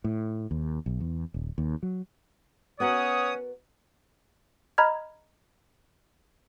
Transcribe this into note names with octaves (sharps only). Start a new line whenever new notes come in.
A2
D#2
B1
E2
D#1
D#2
F#3
B3 C#4 F#4 A#4 C#5 F#5 D#6
D#5 A#5 B5 F6 G#6